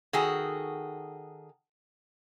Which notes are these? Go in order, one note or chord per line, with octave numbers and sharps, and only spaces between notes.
D#3 F#4 G#4 A4